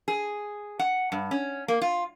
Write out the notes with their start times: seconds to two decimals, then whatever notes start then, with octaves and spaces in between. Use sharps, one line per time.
0.08 G#4
0.79 F#5
1.12 G2
1.31 C#4
1.68 A#3
1.81 F4